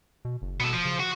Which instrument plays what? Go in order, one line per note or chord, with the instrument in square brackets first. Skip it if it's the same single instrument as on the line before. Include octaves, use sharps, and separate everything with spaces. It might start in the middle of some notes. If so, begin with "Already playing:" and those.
[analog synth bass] B2
F#1
[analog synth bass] B2 [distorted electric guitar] B3 A4
[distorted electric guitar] F3
[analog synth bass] C#3
[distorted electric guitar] F#4